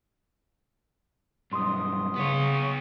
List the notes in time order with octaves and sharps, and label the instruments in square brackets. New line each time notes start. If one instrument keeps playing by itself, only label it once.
[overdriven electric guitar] B1 G2 [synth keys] C6 D#6
[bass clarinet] C#3 [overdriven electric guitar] B3 C#5